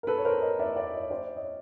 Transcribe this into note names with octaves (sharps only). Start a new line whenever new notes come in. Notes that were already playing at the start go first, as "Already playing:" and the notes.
A#4
A4 B4
C#5
A#4 C5
C#5 D#5
D5 E5
D5 E5
C#5 D#5
C5 D5
C#5 D#5